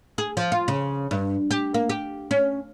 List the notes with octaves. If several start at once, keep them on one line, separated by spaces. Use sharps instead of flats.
G#4
F3
F4
C#3
G2
G4
A#3
G4
C#4